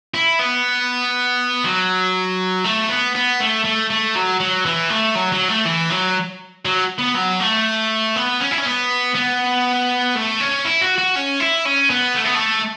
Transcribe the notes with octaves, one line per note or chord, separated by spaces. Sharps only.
E4
B3
F#3
A3
B3
B3
A3
A3
A3
F#3
F#3
E3
A3
F#3
F#3
A3
E3
F#3
F#3
B3
F#3
A3
B3
C#4
E4
C#4
B3
B3
A3
C#4
E4
F#4
F#4
C#4
E4
C#4
B3
A3
B3
A3